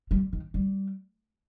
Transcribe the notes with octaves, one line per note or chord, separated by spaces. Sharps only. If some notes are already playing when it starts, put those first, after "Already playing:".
G3
D#3
G3